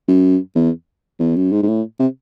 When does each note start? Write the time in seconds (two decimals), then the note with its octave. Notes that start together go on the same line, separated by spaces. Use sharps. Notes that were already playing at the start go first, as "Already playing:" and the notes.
0.08 F#2
0.55 E2
1.19 E2
1.36 F#2
1.52 G#2
1.62 G#2
1.68 A2
1.99 C3